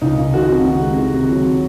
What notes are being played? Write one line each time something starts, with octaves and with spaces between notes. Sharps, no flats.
C#2 D#4
C#2
D#3 F#4
C3
C3
G#3
D#3
C3
F#3